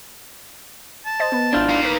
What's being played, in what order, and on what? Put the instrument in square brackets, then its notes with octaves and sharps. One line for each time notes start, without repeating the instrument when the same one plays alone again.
[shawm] A5
[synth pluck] C5 D#5 A6
B3 B4
[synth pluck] G#1 E4 G6 [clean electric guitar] D4 F4
[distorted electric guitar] D#4 F5
[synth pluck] B4 B6